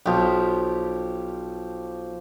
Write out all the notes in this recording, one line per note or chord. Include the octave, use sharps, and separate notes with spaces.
B1 F3 G4